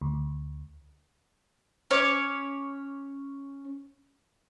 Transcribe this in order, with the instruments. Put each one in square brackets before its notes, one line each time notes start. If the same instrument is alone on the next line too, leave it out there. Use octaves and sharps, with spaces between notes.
[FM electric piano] D2
[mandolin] C#4 C#5 D6